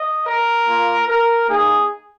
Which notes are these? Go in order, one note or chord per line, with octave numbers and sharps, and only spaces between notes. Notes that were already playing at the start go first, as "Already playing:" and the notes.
Already playing: D#5
A#4
A#3 F4
A#4
A#3 D#4 G#4